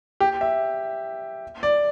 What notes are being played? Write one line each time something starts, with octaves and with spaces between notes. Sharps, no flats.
G4
E5
D5